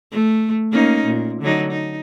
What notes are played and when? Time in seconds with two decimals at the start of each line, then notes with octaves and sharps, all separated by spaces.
0.12 A3
0.72 A#3 C#4 D#4
1.05 A#2
1.42 D3 F#3 D#4
1.72 D#4